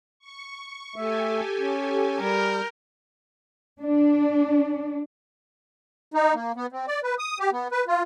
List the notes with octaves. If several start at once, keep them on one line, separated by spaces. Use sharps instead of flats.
C#6
A3 G4 A4 E5 G#5
C#4
G3 A#4 F6 G6
D4
D#4
A#3
B3
C4
D5
B4
D#6
G4
B3
B4
F4